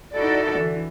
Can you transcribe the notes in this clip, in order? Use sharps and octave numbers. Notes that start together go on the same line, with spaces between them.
D#4 E4 F#4 A4 D5
D3 E3